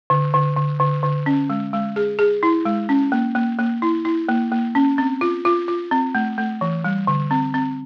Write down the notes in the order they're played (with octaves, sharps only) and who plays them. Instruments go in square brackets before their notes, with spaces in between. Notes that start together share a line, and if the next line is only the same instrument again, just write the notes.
[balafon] D3
D3
D3
D3
D3
C#4
G#3
G#3
G#4
G#4
E4
G#3
C#4
A#3
A#3
A#3
E4
E4
A#3
A#3
C#4
C4
F4
F4
F4
C4
A3
A3
E3
G3
D3
C4
C4